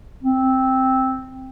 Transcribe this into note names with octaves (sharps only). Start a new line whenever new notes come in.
C4